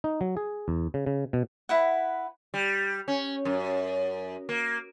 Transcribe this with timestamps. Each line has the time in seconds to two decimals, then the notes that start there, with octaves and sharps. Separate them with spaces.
0.04 D#4
0.21 F#3
0.37 G#4
0.68 E2
0.94 C#3
1.06 C#3
1.33 B2
1.69 E4 B4 F#5
2.54 G3
3.08 C#4
3.45 F#2
4.49 A#3